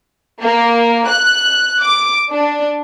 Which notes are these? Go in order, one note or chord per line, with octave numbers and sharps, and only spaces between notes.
A#3
F#6
D6
D4